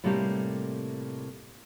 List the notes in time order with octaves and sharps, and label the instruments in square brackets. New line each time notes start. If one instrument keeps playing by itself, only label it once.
[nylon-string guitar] A2 C3 G3 A3 A#3 G4